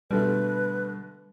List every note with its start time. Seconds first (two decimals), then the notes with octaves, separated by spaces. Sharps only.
0.11 B2 D3 G3 A3 B4